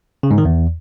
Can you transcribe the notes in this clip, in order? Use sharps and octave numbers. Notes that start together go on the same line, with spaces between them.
C#3
G#2
D#3
E2